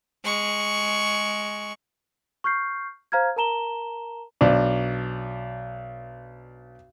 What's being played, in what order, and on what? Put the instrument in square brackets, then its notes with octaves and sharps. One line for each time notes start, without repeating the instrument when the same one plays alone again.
[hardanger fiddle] G#3 C#6
[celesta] C#6 F6 G6 C7
C5 F5 A#5 F6 G#6
A#4 A5 A#5 E7 G7
[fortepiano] B1 D4